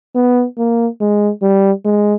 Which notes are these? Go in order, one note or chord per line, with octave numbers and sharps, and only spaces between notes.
B3
A#3
G#3
G3
G#3